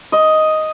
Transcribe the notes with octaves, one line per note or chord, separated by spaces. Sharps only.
D#5